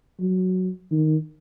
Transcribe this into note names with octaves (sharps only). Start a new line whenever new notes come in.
F#3
D#3